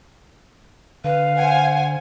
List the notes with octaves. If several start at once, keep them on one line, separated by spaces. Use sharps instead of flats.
D3 B4 F5
C5 F#5 G#5